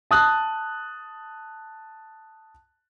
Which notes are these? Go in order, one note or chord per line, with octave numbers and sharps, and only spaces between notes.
A5 D#6 F#6